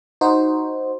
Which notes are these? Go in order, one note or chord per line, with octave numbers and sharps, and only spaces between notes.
D#4 F#4 C5